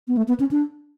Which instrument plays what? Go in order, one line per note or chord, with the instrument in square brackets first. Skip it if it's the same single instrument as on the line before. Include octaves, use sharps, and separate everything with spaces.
[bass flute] B3
A3
B3
C#4
D4